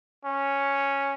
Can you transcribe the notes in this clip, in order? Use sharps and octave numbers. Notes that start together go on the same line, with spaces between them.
C#4